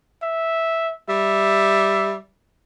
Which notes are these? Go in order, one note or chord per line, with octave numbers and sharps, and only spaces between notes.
E5
G3 E5